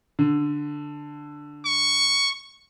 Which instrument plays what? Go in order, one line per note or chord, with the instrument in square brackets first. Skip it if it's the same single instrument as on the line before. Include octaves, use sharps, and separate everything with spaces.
[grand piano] D3
[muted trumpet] C#6